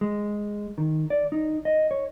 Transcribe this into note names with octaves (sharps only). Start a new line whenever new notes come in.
G#3
D#3
D5
D#4
D#5
C#5